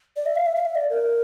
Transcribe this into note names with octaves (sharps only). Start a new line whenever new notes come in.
D5
E5
F5
E5
F5
E5
D5
A#4